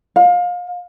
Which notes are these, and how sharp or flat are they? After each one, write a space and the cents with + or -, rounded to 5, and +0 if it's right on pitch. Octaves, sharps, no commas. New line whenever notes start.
F5 +30